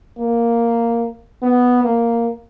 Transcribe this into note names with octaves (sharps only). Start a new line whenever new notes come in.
A#3
B3
A#3